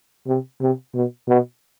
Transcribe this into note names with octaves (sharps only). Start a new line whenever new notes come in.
C3
C3
B2
B2